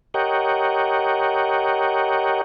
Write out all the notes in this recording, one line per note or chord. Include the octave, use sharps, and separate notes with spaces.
G4 A#4 C#5 D#5 F#5 G5